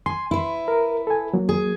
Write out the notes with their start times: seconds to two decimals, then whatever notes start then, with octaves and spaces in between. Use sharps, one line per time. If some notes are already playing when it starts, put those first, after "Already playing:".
0.06 G#5 C6
0.31 E4 B4
0.68 A#4
1.07 A4 G#5
1.34 F#3 A#3
1.49 G#4